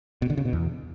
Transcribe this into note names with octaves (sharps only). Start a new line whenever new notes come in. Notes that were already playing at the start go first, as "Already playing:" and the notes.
B2
D3
C#3
B2
E2